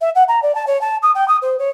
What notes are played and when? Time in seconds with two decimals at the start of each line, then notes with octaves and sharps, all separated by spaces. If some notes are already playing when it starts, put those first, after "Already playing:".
0.01 E5
0.15 F#5
0.28 A#5
0.42 D5
0.55 A5
0.67 C#5
0.81 A5
1.02 D#6
1.15 G5
1.28 D#6
1.42 C5
1.59 C#5